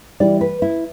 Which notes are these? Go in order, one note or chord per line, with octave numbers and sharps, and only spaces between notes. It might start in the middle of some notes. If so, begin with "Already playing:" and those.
E3 G3 D5
B4
E4